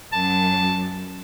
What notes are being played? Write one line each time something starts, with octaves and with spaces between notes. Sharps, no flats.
F#2 A5